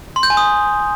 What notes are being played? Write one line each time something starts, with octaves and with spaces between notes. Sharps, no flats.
C6
G6
G#5
D#6